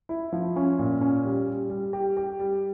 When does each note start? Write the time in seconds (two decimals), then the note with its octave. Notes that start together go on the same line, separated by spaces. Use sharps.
0.09 E4
0.33 F3
0.56 C#4
0.79 A#2
1.01 C#4
1.24 G3
1.48 G3
1.70 G3
1.93 G4
2.17 G4
2.39 G3